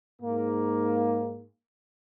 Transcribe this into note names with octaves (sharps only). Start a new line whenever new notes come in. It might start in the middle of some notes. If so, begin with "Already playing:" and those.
G#2 A#3